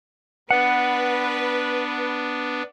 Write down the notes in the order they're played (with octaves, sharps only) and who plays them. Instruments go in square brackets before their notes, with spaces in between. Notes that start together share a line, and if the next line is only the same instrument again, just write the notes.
[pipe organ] B3 D4 [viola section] B4 [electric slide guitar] F#5